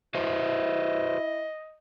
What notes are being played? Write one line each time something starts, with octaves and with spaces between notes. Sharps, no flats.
E4 F#4 B4 C5 D#5